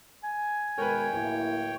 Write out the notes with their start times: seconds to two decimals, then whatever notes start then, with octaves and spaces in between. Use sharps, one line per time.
0.24 G#5
0.78 B2 D#3 G#3 A#4 B4 C#5 G5
1.13 D1 A#3 E4